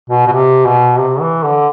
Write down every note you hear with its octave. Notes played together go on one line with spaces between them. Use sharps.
B2
B2
C3
B2
C3
E3
D3